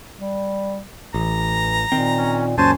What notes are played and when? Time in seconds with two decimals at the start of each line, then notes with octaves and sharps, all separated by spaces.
0.17 G3
1.14 A1 E3 A#5
1.92 A#2 D#3 C4
2.18 C#4
2.58 C#2 F#2 A#2 C#4 C5 G#5 A5